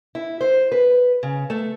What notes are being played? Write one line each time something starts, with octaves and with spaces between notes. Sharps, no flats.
E4
C5
B4
C#3
A3